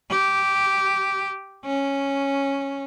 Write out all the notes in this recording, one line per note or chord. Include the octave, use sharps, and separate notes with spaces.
G4
C#4